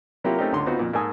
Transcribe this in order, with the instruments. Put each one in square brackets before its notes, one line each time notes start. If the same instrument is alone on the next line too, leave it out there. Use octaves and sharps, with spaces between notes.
[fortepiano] C3 F#3 A#3 E4 F4 G4
A3 C4 C#4 D#4 G4 A#4
C#2 D3 C6
B3 C4 D#4 F4 F#4
F2 A#2
G#2 A#3 D#4 A4 G#5 D#6